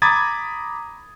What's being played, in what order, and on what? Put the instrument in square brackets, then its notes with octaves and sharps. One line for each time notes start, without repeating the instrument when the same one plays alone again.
[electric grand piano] A#5 B5 D6 D#6 G#6 A6